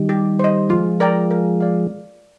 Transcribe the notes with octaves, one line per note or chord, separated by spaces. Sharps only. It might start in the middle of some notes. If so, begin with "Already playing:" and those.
Already playing: D#3 G3
G4
C5 D#5
F3 G#3 F4
A#4 D5 G5 A#5
A#4
D5 F5